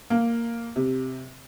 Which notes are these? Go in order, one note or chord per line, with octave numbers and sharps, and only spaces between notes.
A#3
C3